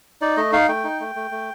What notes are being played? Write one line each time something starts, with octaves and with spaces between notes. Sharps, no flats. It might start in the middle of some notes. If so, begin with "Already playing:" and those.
D#4 D5
A3 D#5
D#4 F5
A3 G5
D#4
A3
A3
A3